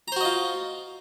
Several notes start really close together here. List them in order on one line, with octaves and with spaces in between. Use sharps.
A#5 C5 F#4 D#5 F4